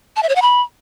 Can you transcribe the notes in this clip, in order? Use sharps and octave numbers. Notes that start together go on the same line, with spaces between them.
A5
E5
C#5
F#5
B5